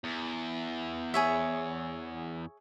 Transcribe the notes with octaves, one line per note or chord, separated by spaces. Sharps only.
E2
G#4 C#5 E5